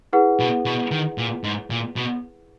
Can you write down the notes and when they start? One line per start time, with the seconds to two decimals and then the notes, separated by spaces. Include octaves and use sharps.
0.13 E4 G#4 B4 F#5
0.40 B2
0.65 B2
0.91 D#3
1.18 A#2
1.44 G#2
1.70 A#2
1.96 B2